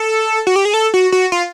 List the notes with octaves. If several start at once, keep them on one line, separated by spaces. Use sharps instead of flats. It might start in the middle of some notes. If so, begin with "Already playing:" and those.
Already playing: A4
F#4
G4
G#4
A4
F#4
F#4
F4